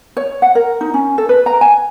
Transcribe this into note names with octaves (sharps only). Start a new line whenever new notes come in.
C#5
F#5
A#4
D#4
C#4
A4
B4
A#5
G#5